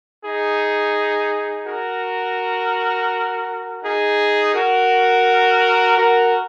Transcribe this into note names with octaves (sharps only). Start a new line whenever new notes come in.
D#4 G#4
F#4 A#4
D#4 G#4
F#4 A#4
F#4 A#4